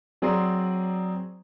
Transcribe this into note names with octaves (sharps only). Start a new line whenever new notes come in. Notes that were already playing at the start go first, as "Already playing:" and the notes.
F#3 C4 G#4 D5 A#5 C6